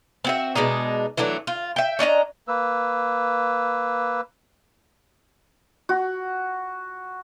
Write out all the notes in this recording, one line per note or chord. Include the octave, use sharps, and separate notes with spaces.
C4 F#4 E5
B2 G#3 D4 D#4
E3 F#3 A3 D4
F4
E5 G5
C#4 D4 D#5 A#5
A#3 B4 E6
F#4